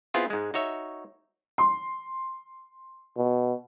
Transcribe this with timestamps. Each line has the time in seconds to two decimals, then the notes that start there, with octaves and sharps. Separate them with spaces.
0.14 B3 C4 E4 F4 G#4
0.30 G#2 G#3
0.54 D#4 F#4 C#5 E5
1.58 C6
3.17 B2